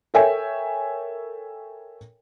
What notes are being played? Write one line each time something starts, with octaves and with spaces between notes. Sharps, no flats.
A4 A#4 C#5 E5 G5 G#5